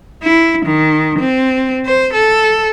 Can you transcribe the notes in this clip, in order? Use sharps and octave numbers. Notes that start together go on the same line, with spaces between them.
E4
D#3
C4
C5
A4